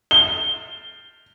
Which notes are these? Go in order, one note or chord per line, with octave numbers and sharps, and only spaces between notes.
G7